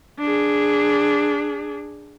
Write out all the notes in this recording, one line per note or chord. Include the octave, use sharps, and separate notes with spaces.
D4 G#4